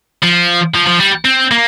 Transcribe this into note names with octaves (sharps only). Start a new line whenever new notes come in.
F3
F3
F3
G3
C4
A#3